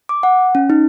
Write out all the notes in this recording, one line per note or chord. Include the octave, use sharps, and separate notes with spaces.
D6
F#5
C#4
D#4